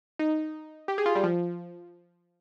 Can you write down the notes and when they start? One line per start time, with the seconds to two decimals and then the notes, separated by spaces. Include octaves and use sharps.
0.19 D#4
0.88 G4
0.98 G#4
1.06 F4
1.15 G3
1.24 F3